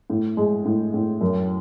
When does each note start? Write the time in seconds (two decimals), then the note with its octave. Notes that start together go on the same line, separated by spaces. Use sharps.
0.10 A2
0.37 G#3
0.65 A2
0.94 A2
1.21 F#2